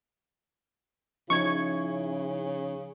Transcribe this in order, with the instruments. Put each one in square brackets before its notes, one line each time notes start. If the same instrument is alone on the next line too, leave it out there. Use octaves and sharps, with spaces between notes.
[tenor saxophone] C#3 [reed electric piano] F3 C#4 D#4 [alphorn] E4 [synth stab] C#6 G#6